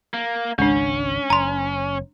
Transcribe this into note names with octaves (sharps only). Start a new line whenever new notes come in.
A#3
G#1 C#2 G#3 C#4 D4
F#1 A#5 C6